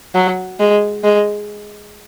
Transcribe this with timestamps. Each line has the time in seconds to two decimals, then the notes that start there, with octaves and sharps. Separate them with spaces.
0.14 F#3
0.60 G#3
1.03 G#3